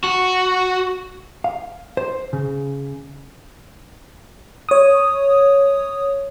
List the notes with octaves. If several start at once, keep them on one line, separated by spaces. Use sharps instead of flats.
F#4
F5
C5
C#3
C#5 D#6